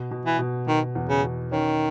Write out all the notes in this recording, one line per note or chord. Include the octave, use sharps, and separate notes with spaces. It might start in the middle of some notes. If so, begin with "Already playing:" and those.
Already playing: B2
B2
E3
B2
B2 D#3
E2
C#3
B2
D#3 C#4